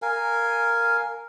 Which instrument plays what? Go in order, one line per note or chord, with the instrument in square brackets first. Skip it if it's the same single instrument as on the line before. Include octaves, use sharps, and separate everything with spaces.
[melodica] A#4 F5 G#5